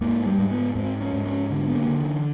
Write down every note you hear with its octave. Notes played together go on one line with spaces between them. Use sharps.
G#2 A#3
G3
G#2
B3
G#2 C4
C#4
G#2
C#4
D3
B3
A#3
D3
E3